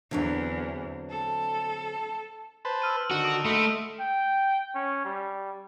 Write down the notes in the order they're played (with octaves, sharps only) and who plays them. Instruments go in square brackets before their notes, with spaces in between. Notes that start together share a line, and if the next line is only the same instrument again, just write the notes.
[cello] E2 [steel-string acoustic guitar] D3 F#3 C4
[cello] A4
[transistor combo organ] B4 C5 A5
[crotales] E6 F6 D#7
[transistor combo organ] D3 D#3 [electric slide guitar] F#4
[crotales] D#6 D7 D#7
[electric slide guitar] A3 [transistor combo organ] D#5 B5 C6
[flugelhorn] G5
C#4
G3